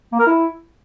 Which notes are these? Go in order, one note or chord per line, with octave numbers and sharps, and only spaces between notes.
A#3
A#4
E4